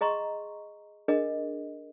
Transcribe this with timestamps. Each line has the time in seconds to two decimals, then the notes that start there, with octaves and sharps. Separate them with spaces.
0.01 G#4 D#5 A#5 C6 C#6
1.08 D4 G#4 A#4 D#5